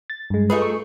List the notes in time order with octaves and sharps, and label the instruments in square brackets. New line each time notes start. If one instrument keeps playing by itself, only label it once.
[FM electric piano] A6
G2 G#3
[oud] A3 D#4 G#4 [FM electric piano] F4 B4
[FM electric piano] C#6